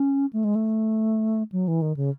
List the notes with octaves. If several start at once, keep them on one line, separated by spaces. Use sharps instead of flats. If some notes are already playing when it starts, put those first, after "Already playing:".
Already playing: C#4
A3
G#3
A3
F#3
E3
D#3
C#3